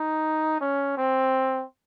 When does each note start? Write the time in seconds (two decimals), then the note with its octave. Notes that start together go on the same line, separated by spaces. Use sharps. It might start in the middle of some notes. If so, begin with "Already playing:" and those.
Already playing: D#4
0.61 C#4
0.97 C4